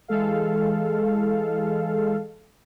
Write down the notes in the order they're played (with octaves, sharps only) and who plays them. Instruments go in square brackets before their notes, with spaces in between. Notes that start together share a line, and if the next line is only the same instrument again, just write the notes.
[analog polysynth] E3 G#3 A4 F5